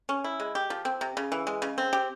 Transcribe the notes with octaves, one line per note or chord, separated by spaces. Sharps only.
C#4
E4
G#3
G4
F3
C4
C3
C#3
E3
G#3
C#3
C4
G4